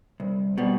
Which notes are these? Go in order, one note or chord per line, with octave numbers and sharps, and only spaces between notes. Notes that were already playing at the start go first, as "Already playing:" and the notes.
C2
B2 G3